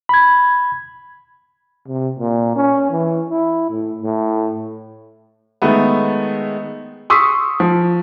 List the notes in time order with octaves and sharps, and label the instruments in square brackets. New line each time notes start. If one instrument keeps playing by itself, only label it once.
[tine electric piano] B5 G#6
[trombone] C3
A#2
C#4
E3
E4
A2
A2
[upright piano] D#3 G#3 A3 B3
[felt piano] C6 C#6 D#6 E6 B6
F3